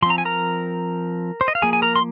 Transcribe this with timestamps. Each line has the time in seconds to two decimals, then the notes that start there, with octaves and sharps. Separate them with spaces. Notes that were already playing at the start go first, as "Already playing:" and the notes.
0.02 F3 C6
0.06 C4 A#5
0.18 G#5
0.25 A#4 A#5
1.41 C5
1.48 D#5
1.55 F5
1.62 F3 A#3 G#4 G#5
1.73 G#5
1.82 A#4 A#5
1.96 C6